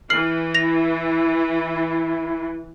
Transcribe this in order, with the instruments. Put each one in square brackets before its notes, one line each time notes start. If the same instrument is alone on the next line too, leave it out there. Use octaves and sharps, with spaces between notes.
[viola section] E3 [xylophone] F6 C7 F#7
[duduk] E4 [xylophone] A#6 F7